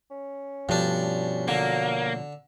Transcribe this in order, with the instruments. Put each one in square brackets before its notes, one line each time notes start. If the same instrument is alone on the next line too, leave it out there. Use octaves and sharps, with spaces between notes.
[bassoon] C#4
[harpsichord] G2 D4 [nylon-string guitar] B2 F3 A3
[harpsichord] D3 [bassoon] F#3 [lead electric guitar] A#3